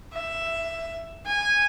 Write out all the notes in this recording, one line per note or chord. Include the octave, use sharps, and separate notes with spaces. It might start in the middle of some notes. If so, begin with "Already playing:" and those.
E5
G#5